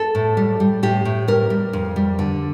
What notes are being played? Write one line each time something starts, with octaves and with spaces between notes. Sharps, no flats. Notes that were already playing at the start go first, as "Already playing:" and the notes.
Already playing: A4
A2
G3
G3
A2 G4
A2
G3 A#4
G3
F2
G3
D3